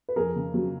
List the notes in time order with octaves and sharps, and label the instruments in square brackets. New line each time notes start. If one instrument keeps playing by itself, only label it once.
[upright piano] B4
[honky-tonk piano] F2 [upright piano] G#4 A#4
[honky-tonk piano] C#3
F#3